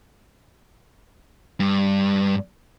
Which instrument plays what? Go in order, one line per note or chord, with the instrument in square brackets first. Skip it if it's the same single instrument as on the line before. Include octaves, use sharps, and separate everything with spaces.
[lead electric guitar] G2